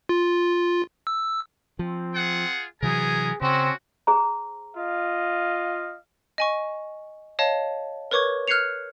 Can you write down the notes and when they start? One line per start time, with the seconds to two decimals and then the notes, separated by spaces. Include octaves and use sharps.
0.09 F4
1.07 E6
1.79 F3 C4
2.14 F4 G#4 F#5
2.82 C3 E3 F#3 B3 G#4 A#4 G#5
3.42 C#3 C4 C#4 F#4
4.07 G#4 C5 A#5
4.77 F4 D#5 F5
6.38 D#5 G#5 C#6
7.39 C#5 D#5 F5 A5
8.11 A#4 B4 C#5 C#6 D6 G#6
8.47 F6 F#6 G#6 C7 C#7 F7